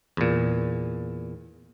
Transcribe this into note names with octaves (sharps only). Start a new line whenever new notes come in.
E2 A#2